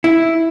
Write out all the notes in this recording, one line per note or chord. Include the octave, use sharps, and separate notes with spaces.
E4